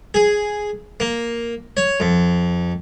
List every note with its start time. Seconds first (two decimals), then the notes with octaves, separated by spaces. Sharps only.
0.14 G#4
1.00 A#3
1.77 C#5
2.00 F2